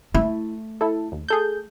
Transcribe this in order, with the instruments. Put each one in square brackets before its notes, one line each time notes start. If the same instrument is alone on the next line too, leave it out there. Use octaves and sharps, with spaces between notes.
[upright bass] A3 [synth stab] E4
[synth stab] E4 A4
D#2
G#4 A4 G6